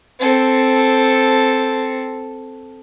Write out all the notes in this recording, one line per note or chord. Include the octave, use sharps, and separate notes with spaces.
C4 A4